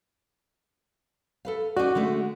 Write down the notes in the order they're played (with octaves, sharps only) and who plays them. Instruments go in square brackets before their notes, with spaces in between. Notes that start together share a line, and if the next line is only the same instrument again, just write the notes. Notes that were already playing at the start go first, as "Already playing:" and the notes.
[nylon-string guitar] A4 B4 F5
[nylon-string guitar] C#4 D#4 D5 [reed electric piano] F#4
[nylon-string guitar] D3 G#3 A3